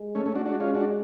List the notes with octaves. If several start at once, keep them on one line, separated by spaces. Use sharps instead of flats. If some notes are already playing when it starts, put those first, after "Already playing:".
Already playing: G#3
A3 C#4
A3 C#4
D4 F#4
G#3 D4 F#4
C#4 F4
D4 F#4